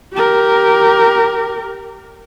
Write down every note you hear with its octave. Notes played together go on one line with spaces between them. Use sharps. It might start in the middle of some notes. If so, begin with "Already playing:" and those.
G4 A#4